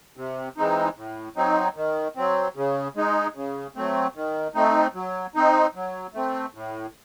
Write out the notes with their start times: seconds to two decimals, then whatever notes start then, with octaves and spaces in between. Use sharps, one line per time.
0.17 C3
0.57 E3 G#3 C4 D#4
0.97 A2
1.36 F#3 C4 D#4
1.76 D#3
2.16 F#3 C4
2.56 C#3
2.96 G#3 D#4
3.35 C#3
3.76 F#3 A3 C4
4.16 D#3
4.55 A3 C4 D#4
4.95 F#3
5.35 C4 D#4
5.75 F#3
6.14 A3 C4
6.55 A2